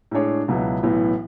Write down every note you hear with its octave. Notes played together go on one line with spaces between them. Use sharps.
A2 G#3 D4 G#4 C#5
C#2 B2 F#3 B3 E4
B1 A2 E3 B3